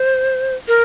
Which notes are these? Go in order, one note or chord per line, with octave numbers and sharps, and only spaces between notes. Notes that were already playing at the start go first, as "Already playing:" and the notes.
Already playing: C5
A#4